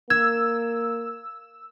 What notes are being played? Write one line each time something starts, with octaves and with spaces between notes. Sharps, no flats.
A#3 E6 G#6